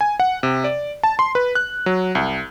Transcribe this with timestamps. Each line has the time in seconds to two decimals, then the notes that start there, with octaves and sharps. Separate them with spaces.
0.01 G#5
0.20 F#5
0.43 C3
0.64 D5
1.03 A5
1.19 C6
1.35 B4
1.55 F#6
1.86 F#3
2.15 C2